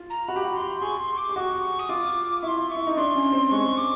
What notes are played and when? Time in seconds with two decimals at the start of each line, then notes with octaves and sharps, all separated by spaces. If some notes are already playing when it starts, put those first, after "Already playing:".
Already playing: F4
0.10 A#5
0.28 F#4 B5
0.36 G4
0.44 F#4
0.55 C6
0.82 G#4 C#6
1.00 C6
1.17 D6
1.29 G4
1.36 F#4 C#6 D6
1.79 D#6
1.89 F4 D6
2.43 E4 C#6
2.47 C6
2.69 C#6
2.76 E4
2.87 D#4
2.97 D4 C6
3.15 C#4
3.33 C4
3.51 G#3 C#6
3.77 D6